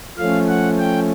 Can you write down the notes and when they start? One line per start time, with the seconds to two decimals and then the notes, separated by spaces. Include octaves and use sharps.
0.17 F3 A3 C#4 F5
0.48 F#5
0.78 G5